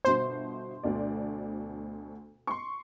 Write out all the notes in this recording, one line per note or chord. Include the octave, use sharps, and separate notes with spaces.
G1 B2 C5 C6
D2 B2 D5
C6 C#6